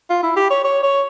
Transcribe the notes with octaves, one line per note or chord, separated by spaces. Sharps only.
F4
E4
G4
C#5
C#5
C#5